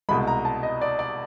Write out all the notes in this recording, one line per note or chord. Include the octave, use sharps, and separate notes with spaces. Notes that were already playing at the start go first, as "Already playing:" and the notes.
C2 B2 G#3 B5
A#5
A5
D#5
D5
D5